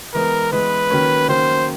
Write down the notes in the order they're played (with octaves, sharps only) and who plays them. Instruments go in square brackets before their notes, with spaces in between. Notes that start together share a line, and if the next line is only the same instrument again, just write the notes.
[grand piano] E3 G#3 B3 [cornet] A#4
[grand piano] E3 G#3 B3 [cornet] B4
[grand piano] D#3 F#3 A#3 C#4
[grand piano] D#3 F#3 A#3 C#4 [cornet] C5